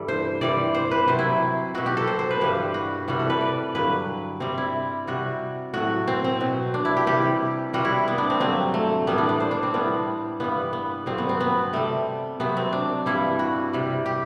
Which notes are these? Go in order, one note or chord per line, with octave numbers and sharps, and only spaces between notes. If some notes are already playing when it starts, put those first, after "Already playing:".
Already playing: G2 E3 G3 A4
C5
C3 E3 G3 D5
C5
B4
C3 F#3 C5
E4
B2 F#3 F#4
G4
A4
C5
C5
B4
G2 E3 G3 G4
F#4
C3 E3 G3 F#4
A4
B4
D5
G2 D3 F#3 B4
C3 G3 C4
E4
C3 G3 F#4
A2 F#3 F#4
C4
C4
B2 F#3
D4
E4
G4
C3 E3 G3 G4
C3 G3 F#4
E4
B3
D4
C4
G2 D3 F#3 C4
A3
A2 E3 G3 B3
D4
D4
C5
D4
C4
A2 E3 G3 B3
G2 E3 G3 B3
B3
G2 D3 F#3 C4
B3
C4
B3
C3 G3 A3
C3 F#3 B3
C4
D4
G2 E3 G3 E4
F#4
C3 G3
G4